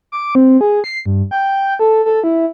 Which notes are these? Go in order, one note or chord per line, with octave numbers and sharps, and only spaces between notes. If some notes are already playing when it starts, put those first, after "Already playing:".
D6
C4
G#4
C7
G2
G5
A4
A4
E4